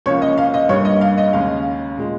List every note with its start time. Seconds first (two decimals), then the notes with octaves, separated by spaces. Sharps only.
0.06 C#2 C#3 F3 A#3 C#4 C#5
0.22 D#5
0.38 F5
0.54 D#5
0.69 G2 G3 A#3 C#4 C#5
0.85 D#5
1.01 F5
1.18 D#5
1.33 D#2 C#3 G#3 C#4 F5
1.98 A#2 G#3